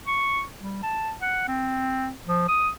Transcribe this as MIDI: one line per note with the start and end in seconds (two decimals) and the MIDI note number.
0.07 0.43 85
0.61 0.82 55
0.83 1.12 81
1.21 1.46 78
1.48 2.10 60
2.27 2.44 53
2.48 2.69 87